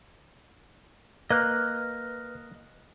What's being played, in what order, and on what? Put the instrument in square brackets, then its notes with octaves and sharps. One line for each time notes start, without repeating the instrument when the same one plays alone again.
[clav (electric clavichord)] A#3 [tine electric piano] B4 F6 [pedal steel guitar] D#5 F#6